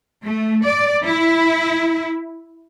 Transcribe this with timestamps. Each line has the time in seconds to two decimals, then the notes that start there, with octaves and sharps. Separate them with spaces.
0.23 A3
0.63 D5
1.05 E4